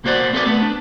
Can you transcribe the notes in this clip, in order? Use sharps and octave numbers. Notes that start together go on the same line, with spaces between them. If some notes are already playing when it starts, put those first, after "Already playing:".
B1 A#3 F#4 C5 D5 F#5
C4 A4 B4 D5
A3 B3
D4